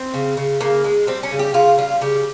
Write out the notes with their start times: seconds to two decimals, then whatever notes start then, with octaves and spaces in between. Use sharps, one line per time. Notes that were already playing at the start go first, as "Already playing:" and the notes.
Already playing: C4
0.14 C#3
0.37 C#3
0.61 C#3 A#3
0.84 G#3
1.07 G3 C4
1.23 C#4
1.31 C#3
1.39 G4
1.54 C#3 F4
1.78 G3 F4
2.01 C#3 G4